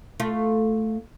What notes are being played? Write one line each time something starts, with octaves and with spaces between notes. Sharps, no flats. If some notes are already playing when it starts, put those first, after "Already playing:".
A3 F4